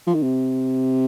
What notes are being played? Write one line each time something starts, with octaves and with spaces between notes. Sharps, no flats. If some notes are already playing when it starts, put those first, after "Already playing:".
F3
D#3
C3